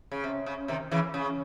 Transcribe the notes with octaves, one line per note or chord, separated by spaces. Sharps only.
C#3
C3
C#3
C3 D#3
C#3 E3
C#3